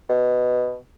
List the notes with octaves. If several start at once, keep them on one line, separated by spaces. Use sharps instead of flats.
B2